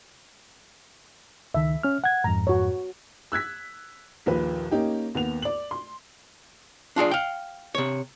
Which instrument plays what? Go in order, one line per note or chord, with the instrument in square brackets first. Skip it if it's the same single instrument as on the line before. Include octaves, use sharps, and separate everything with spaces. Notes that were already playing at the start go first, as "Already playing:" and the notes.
[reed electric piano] C#2 D#3 [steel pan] E5
[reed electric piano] C#4 F6
F#5 G#6
[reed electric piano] F2 G#2 [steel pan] A#5
[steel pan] F#4 C#5
[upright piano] E6 F#6 G#6 B6
A#1 D#2 A#2 B4
A#3 C#4 D#4 G4
D#2 B3 F7
D5 F#7
C6
[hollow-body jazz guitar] D4 F4 G#4 D5
F5 G5
C3 C#5